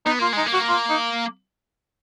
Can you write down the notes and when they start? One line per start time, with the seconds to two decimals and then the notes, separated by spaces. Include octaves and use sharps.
0.06 B3 D#4
0.19 A#3 F4
0.33 G#3 D#4
0.47 A#3
0.53 F#4
0.69 F4
0.90 D#4